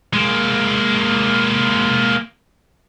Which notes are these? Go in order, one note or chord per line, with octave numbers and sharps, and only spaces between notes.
G#3 A#3